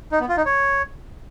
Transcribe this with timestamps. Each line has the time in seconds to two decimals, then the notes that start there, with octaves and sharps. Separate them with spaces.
0.12 D#4
0.20 B3
0.29 F4
0.37 D#4
0.46 C#5